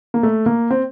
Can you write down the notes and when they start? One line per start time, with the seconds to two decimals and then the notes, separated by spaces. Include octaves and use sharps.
0.14 A#3
0.23 A3
0.46 A#3
0.71 C4